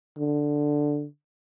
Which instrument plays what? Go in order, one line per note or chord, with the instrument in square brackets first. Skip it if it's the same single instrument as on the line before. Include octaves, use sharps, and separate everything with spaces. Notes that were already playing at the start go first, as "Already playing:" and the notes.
[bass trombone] D3